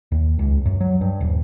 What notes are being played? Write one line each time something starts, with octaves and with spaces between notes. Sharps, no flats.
D#2
C#2
F#2
F#3
G2
D#1